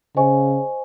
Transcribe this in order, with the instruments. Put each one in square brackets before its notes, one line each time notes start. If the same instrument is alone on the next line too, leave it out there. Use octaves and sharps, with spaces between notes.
[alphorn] C#3 [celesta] C5 D#5 G#5 C#6